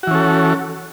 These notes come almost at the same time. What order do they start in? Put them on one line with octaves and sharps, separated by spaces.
F#4 E3 C#4 A4